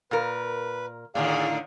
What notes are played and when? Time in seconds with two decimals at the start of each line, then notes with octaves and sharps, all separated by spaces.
0.11 A#2 A#4 B4
1.15 A2 D3 D#3 G#4 D5 F5